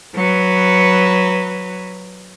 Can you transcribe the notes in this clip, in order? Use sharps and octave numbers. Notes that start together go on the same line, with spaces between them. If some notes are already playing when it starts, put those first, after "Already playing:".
F#3 B4